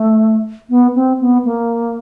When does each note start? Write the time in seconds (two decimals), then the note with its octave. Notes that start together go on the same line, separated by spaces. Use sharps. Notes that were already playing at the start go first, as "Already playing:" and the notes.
Already playing: A3
0.70 B3
0.95 C4
1.20 B3
1.45 A#3